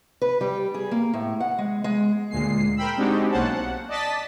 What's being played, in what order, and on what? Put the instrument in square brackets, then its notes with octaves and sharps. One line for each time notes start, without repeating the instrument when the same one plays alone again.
[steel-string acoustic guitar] B4
G3
G#4
A#3
A2
F#5
G#3
G#3
[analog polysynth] D2 A#2 G#3 C7
A#4 C5 G5 B5 E6
G#3 C4 D4 D#4 F#4 G4
B1 A#3 C#4 C5 F#5 A5
F#5
D5 D#5 A5 A6 B6